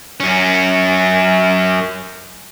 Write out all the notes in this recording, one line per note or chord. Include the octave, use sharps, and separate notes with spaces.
F#2 C#4